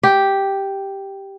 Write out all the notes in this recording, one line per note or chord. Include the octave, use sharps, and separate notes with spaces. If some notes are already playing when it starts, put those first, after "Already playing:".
G4